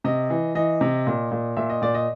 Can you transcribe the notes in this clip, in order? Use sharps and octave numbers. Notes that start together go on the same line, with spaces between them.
C3 D#5
E3
E3 D#5
C3
A#2
A#2
A#2 E5
D#5
A#2 D5
D#5